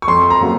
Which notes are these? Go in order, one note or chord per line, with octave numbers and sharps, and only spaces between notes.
C#6
F2 C6
A#5
C#3 F#3 A#3